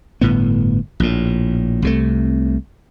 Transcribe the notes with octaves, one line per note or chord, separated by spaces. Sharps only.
G1 A2 B3
A#1 A2
C2 C3 A3